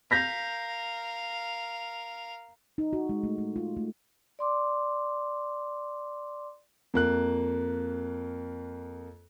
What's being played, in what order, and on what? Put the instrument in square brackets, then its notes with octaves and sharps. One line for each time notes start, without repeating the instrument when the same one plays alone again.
[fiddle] A#4 F5 [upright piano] G6 A#6 B6
[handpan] D#4
F#4
G#3
A3
A3
F4
A3
[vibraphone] D5 C6 D6
[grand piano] F2 A#3 F#6